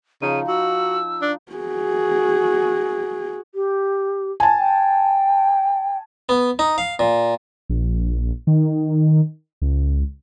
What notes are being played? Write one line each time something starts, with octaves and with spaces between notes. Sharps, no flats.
C#3 F3 D#4 D#7
F#4 E6
D4
F#4 G#4
G4
G#5 A5
G5
B3
D#4
F5
A#2
A#1
D#3
C#2